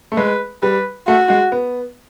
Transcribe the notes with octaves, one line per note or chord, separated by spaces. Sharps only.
A3
G#3 B4
G3 B4
A3 F#4
G#3
B3